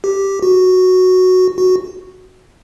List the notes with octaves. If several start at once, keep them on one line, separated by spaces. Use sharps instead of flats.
G4
F#4
F#4